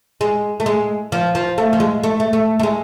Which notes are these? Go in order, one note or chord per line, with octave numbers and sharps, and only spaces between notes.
G#3
A3
G#3
F3
F3
A3
F3
G#3
A3
A3
A3
A3
G#3